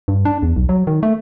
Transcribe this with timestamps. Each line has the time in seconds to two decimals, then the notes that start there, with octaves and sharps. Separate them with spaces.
0.08 G2
0.25 D4
0.42 E2
0.56 B1
0.69 F#3
0.87 D#3
1.03 A3